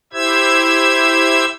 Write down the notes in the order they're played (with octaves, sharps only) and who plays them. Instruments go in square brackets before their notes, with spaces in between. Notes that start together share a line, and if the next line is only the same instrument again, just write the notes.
[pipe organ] E4 G4 C5 E5 E6 G#6